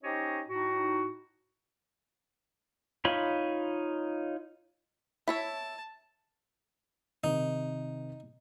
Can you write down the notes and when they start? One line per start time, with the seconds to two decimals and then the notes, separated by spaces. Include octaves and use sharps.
0.03 C#4 D#4 G4 C5 C#5 D#5
0.48 A2 D#4 F#4
3.05 D#4 F4 C#5 B5 C6
5.28 E4 C#5 E5 A5
7.24 C3 D#3 D#4